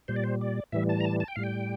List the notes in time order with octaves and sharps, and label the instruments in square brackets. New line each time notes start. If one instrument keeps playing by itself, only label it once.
[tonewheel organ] A#2 G3 C5
D5
C5
D5
A2 E3 G3 E5
A5
A#5
A5
A5
G5
A2 G3 F5
G5